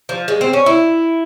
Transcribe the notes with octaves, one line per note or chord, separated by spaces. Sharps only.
F3
G#3
C4
C#4
E4